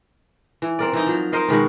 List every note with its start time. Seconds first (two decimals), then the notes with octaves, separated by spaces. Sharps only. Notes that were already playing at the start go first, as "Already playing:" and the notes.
0.62 E3
0.79 C4 A#4 D5
0.93 E3 D#4
1.07 F3 F#3
1.32 A#4 C5 D#5 F5
1.49 B2 D#3 G#3 F#4